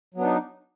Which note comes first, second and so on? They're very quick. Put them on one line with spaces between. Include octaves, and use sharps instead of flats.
F#3 B3 D4 D#4